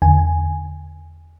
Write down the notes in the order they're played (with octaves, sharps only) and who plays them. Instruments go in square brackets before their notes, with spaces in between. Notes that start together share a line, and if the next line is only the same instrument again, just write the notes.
[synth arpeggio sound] E2 D3 G#5